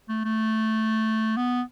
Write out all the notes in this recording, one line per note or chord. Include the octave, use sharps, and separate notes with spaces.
A3
A3
B3